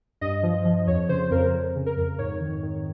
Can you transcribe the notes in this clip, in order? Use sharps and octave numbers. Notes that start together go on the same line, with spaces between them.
G2 D#5
F3
F3
F2 C#5
C#3 C5
F2 A#4
F2
C#3
A#4
F2
G#2 C#5
D#3
D#3